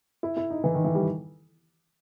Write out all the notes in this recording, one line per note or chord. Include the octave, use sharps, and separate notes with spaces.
E4
E4
D#4
E3
D#3
E3
G3